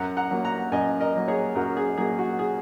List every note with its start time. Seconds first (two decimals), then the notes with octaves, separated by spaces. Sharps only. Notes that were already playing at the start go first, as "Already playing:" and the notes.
Already playing: F#2 F#5 A#5
0.17 F#5 A#5
0.31 F#3 A#3
0.45 F#5 A#5
0.72 F#2 D#5 G#5
1.00 A#4 D#5
1.14 F#3 A#3
1.28 G#4 C#5
1.55 F#2 F#4 A#4
1.77 G#4
1.98 F#3 A#3 G#4
2.19 F#4
2.39 G#4